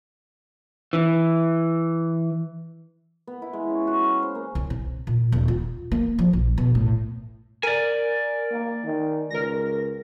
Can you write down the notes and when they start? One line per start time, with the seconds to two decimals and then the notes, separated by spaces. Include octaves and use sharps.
0.93 E3
3.27 B3
3.42 E4
3.53 G#3
3.70 C#4
3.87 F#4
4.03 F5
4.23 C5
4.35 A#3
4.55 C2
4.70 C3
5.07 A#2
5.32 D#1
5.48 F4
5.91 A#3
6.19 F3
6.33 A#1
6.58 B2
6.75 A2
7.63 A#4 D5 G#5
8.51 A#3
8.85 D#3
9.30 C#2 A#4 A#6